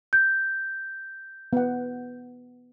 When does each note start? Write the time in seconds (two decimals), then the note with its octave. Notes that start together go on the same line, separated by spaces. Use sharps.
0.13 G6
1.53 B3 F#5